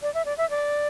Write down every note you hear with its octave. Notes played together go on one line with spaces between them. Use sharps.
D5
E5
D5
E5
D5